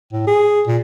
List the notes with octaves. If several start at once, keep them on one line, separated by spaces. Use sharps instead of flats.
A2
G#4
A#2